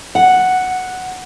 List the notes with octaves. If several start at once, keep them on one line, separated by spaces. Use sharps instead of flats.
F#5